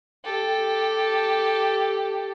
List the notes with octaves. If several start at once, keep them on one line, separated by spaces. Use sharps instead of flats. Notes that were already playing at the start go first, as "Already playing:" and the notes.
G4 A4